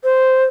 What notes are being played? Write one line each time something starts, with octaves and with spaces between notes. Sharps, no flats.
C5